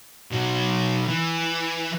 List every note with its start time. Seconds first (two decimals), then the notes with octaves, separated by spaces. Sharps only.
0.31 B2 F#3
1.08 E3